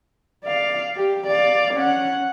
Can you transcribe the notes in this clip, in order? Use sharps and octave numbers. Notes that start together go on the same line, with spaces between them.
D5 F5
G4
D5 F5
C#4 F#5